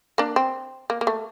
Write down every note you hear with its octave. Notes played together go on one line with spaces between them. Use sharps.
A#3 D4
C4
A#3
A#3
A3